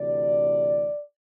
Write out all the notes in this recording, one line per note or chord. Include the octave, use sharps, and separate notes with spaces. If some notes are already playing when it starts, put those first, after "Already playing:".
Already playing: D2 C3 E3 D5